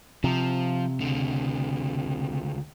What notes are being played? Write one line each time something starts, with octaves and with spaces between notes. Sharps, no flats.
C3 F3
C#2 D3